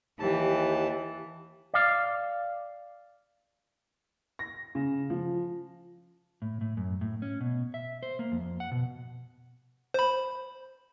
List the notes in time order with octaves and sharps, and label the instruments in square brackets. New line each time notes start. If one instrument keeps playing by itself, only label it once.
[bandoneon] D#2 A5 [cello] E3 [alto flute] G4
[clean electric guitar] D5 F5
[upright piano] A#6
C#3
F3
[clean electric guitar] A2
A2
F#2
A2
C#4
B2
E5
C5
A#3
F2
F#5
B2
[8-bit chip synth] C5 B5